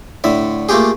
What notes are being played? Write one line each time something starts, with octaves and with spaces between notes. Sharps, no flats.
A2 D3 E5
A3 A#3 F4 G4 G#4